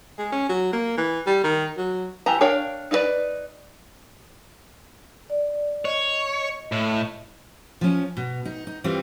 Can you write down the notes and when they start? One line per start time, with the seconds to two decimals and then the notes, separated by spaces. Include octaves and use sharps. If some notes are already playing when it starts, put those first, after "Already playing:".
0.19 G#3
0.32 C#4
0.49 F#3
0.73 A#3
0.97 E3
1.26 G3
1.44 D#3
1.77 F#3
2.26 E3 G4 A5 A#5
2.41 D4 A#4 C#5 F5 G5
2.91 D#4 F4 F#4 B4 D5
5.30 D5
5.85 C#5 D#5
6.72 A2
7.81 F3 C#4
8.17 B2
8.45 D#4
8.67 D#4
8.84 E3 G3 C4 F4